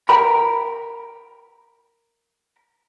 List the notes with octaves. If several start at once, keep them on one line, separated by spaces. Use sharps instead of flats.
A#4 G5 A#5 B5